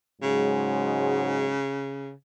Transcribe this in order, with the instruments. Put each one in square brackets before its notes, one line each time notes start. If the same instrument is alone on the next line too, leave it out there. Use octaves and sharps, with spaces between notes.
[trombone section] G#2 F#3 G#3 [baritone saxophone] C#3